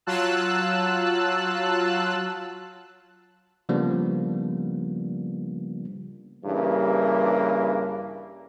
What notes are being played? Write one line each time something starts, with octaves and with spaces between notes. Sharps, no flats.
F#3 F4 A5 E6 F#6
C#3 F3 G3 A#3 B3 D4
G2 C#3 E3 A#3